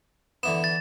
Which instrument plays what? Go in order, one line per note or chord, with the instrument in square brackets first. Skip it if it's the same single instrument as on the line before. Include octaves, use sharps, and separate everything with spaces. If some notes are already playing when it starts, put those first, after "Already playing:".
[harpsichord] D3 E3 B3 [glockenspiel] E7
[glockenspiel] A6